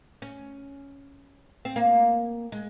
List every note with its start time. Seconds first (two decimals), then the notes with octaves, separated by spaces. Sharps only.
0.22 C#4
1.65 C4
1.76 A#3
2.52 G#3